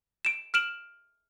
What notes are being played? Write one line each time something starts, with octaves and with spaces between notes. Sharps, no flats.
D7 E7
F6 D7 E7 F#7